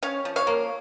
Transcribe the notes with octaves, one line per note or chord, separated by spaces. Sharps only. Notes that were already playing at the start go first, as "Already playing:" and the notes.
C#4 C#5 F5
F3
C#5 F5
A#3